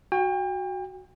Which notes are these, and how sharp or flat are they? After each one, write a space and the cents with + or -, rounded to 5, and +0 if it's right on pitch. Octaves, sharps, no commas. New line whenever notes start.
F#4 +0 G5 +35